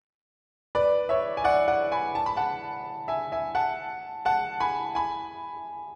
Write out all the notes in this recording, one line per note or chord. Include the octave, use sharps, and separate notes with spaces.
B4 D5
C#5 E5
G#5
D5 F#5
D5 F#5
G#5 B5
A5
B5
F#5 A5
E5 G#5
E5 G#5
F#5 A5
F#5 A5
G#5 B5
G#5 B5